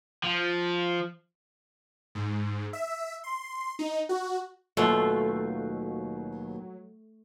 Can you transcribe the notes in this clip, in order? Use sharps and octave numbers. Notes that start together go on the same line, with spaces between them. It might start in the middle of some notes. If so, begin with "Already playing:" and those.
F3
G#2
E5
C6
D#4
F#4
D#2 B2 F#3 A3 F4